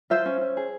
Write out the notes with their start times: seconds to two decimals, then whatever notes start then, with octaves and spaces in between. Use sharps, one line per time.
0.10 F4 C5 E5
0.26 C#4
0.41 C#4
0.57 G#4